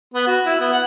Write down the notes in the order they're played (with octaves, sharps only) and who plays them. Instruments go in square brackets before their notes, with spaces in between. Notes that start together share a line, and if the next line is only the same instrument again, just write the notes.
[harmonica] B3
F#4
E4
B3
F#5